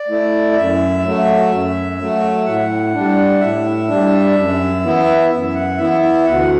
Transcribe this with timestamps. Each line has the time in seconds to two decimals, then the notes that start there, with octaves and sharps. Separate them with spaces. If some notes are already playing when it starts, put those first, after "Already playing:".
Already playing: D5
0.08 A3 E4
0.52 D5
0.56 F#2 E5
1.04 F#3 A3
1.51 F#2
1.99 F#3 A3
2.45 A2 F#5
2.93 G3 D4
3.40 A2 E5
3.88 G3 D4
4.36 F#2
4.82 E3 B3 E4
5.30 F#2 E5
5.55 F#5
5.77 E3 B3 E4 E5
6.02 E5
6.25 D2 F#5